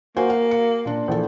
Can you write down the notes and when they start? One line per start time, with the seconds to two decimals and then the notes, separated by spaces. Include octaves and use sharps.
0.17 A#3 F#4 C5 G#5
0.30 F5
0.51 C#7
0.85 A#2 D4
1.08 A#1 E3 A4